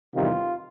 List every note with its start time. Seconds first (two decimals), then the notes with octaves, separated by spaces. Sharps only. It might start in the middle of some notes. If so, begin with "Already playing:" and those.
0.15 E2 C3 D#3 G3 F4